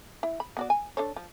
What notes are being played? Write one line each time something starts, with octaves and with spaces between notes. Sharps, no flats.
E4
B5
B3 F#4 D5
G#5
D4 A4 C#5
F3